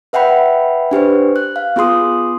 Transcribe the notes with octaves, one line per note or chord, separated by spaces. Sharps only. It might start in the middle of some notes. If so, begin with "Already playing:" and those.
B4 E5 F#5 G5 B5
D4 G4 B4 C5
F#6
F5
B3 F4 G#4 C6 D#6